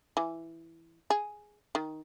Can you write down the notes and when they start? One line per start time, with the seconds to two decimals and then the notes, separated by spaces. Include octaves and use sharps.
0.17 E3
1.10 G#4
1.75 D#3